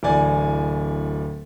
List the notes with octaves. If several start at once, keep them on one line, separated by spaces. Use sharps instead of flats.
D1 E3 D5 G#5